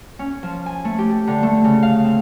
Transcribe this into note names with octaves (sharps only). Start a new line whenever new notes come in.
C#4
F3
G#5
A3
G4
D3
A3
C#3
F5
C4